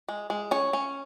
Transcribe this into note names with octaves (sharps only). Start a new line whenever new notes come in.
G#3
G#3
C#4 C#5
C#4